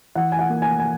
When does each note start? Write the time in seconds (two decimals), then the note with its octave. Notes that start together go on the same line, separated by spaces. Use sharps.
0.15 E3 F#5
0.32 G#5
0.39 F#5
0.50 A#3
0.62 G#5
0.80 G#5